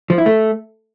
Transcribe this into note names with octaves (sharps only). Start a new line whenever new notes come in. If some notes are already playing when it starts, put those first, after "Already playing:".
F3
E4
A3